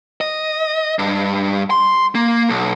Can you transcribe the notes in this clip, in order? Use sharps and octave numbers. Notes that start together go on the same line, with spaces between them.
D#5
G2
C6
A#3
B1